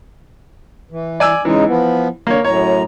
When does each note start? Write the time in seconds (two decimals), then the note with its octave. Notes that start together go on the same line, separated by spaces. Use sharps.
0.91 E3
1.20 D5 G#5 E6
1.45 C#3 E3 G#3 D#4
1.67 F3 B3
2.27 D3 A#3 C#5
2.44 F#2 A2 C#5 A#5